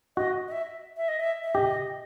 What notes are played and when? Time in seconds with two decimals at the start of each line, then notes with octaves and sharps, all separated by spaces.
0.17 F#4 D#5
0.48 D#5
0.52 E5
0.97 E5
1.08 D#5
1.20 E5
1.44 E5
1.55 G4 D#5